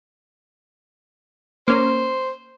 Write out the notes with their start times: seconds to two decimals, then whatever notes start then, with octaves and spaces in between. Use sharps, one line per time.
1.68 A#3 C#4 C5